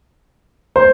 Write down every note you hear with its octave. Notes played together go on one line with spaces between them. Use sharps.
C5